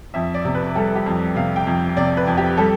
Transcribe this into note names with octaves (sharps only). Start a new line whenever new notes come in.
F2 E5
D5
C3
B4
G3 A4
G4
F2
C3 F5
G5
F2
C3 D5
B4
F2
G4
G3 A4